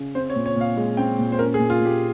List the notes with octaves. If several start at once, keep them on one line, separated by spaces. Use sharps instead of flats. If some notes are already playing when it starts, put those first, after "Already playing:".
Already playing: C#3
C4 C5
C#5
A#2
C#5
A#2 F5
G#3
C4 G5
A#2
C5
C#4 A#4
G#4
A#2
F4
A#2 G4